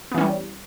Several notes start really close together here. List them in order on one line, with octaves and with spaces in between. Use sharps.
B3 E3 C#4 G3